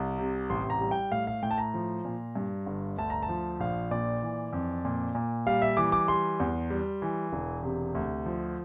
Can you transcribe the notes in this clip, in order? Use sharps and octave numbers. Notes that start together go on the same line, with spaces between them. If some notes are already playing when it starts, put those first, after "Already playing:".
Already playing: C2
C3
A1 C6
A#5
G3
G5
A2 F5
F5
A2 G5
A5
A#5
F3
A#2
G2
G1
D2 A5
A#5
A5
F3
A#1 F5
A#2 D5
E3
F2
A#2
A#2
G3 F5
E5
E3 D6
D6
G3 C6
E2
G3
E3
E1
C3
D2
F3